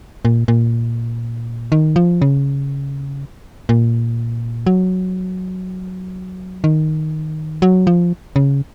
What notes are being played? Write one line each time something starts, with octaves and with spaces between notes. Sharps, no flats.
A#2
A#2
D#3
F3
C#3
A#2
F#3
D#3
F#3
F3
C#3